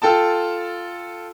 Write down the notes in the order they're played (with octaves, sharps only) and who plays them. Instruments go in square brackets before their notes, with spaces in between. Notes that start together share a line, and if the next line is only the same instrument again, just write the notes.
[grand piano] F4 A4 G5 A5